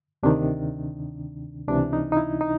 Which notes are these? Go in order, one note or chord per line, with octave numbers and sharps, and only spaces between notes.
D2 C3 D#3 D4
C#2 C3 E3 D4
D#4
D#4
E4
D#4